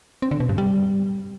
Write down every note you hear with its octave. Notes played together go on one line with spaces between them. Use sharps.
C4
D3
B2
G2
G3